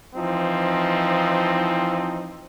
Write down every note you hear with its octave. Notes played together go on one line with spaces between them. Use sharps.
E3 F3 C4 D#4